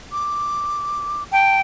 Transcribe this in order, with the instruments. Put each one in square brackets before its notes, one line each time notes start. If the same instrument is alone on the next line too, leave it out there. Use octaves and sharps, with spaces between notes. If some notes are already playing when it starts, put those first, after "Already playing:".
[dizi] D6
[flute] G5 [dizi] A5